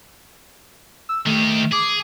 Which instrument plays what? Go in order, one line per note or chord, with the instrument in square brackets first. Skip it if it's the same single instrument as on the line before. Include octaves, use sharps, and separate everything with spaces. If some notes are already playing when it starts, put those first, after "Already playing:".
[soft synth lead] E6
[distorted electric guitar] D#3 G4 [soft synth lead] A3
[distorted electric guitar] G#4 [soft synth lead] D6